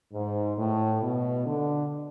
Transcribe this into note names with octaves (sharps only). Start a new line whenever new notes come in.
G#2
A2
B2
D3